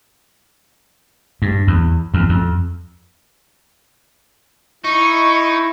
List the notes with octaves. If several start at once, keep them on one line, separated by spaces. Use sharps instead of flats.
G2
E2
E2
F2
D#4 E4 C#6